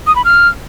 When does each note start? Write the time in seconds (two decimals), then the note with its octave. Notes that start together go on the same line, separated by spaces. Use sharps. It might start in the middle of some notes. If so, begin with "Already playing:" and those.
0.07 D#6
0.16 B5
0.25 F6